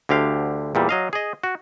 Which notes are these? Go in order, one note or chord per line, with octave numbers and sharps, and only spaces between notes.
D2 D3 G4 F5
E2 A#2 G3
F#3 D#5 F5
G#4 D#5
F#4